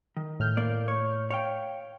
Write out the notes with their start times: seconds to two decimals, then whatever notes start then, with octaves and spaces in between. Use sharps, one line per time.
0.17 D#3
0.40 A2 F6 G6
0.57 A#3 D5
0.88 C#5
1.31 C#5 F5 G5